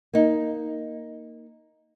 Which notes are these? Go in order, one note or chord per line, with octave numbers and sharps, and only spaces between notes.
A#3 D#4